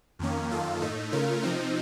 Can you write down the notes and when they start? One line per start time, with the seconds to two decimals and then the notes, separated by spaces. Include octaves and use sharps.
0.19 F2 D#3 A#3 C#4
0.50 F#2 D#3 A#3 F4 A4
0.81 A2 A3 D#4
1.11 C#3 A3 C#4 F4 A#4
1.43 C3 F3 C4 D#4